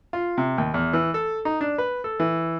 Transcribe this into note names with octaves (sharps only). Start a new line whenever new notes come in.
F4
C3
D#2
E2
E3
A4
D#4
D4
B4
A4
E3